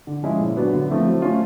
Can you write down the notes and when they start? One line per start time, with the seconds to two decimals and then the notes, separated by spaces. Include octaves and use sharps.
0.07 D3
0.23 F3 G#3 C#4 E4
0.39 A#2
0.57 F#3 B3 D4
0.73 D3
0.90 F3 A3 C4 E4
1.06 F#3
1.22 A3 C#4 F4